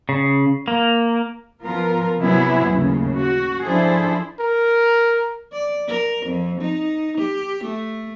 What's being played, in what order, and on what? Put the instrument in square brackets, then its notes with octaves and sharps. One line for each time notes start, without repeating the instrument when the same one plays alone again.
[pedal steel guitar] C#3
A#3
[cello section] F3 B3 F4 A#4
C3 F#3 B3 E4 G#4
D#2 A2 C#3
F#4
F3 D4 E4 G#4 A4 C5
[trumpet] A#4
[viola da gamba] D5
A#4
F2
D#4
G4
A3